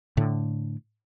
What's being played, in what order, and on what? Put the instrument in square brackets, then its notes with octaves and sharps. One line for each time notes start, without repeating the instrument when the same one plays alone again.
[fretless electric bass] A2 D3